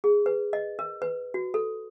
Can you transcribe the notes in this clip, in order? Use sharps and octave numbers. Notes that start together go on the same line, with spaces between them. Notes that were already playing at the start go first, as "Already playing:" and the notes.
G#4
B4
D#5
A#4
B4
F#4
A4